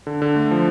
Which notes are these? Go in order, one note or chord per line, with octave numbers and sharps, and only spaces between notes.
D3
D3
A3
F3